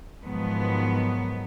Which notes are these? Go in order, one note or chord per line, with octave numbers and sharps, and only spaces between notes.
G#2 D#3 F3 F#3 B3